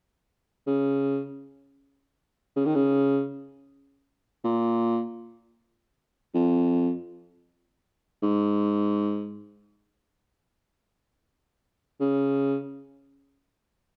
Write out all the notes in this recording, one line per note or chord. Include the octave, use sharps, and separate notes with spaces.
C#3
C#3
D#3
C#3
A#2
F2
G#2
C#3